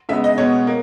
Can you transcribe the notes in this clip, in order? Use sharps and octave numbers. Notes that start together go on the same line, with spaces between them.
C#3 G#3 B3 E5
D#5
B2 G#3 B3 C#5
A#3